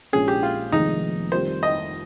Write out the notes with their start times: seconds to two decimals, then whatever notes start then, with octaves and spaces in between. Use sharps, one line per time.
0.13 A#1 A#2 G#3 C#4 G#4
0.28 G4
0.43 F4
0.72 F1 F2 D#3 G#3 D#4
1.32 D#3 G3 C4 F4 A#4 C5
1.63 D#5